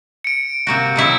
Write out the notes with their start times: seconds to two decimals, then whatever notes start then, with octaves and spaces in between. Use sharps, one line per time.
0.24 C#7 D7
0.67 C3 A#3 F#4
0.96 B2 F#3 E4